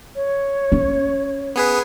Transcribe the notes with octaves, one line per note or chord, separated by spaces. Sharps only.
C#5
C#4
B3 G#4 B4